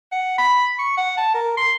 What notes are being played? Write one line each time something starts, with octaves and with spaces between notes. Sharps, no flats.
F#5
B5
C#6
F#5
A5
A#4
C6